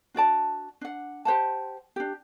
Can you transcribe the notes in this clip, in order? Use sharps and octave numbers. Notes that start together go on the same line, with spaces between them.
D4 F#4 D5 A5
D4 F#5
G4 C5 F#5 A5
D4 G4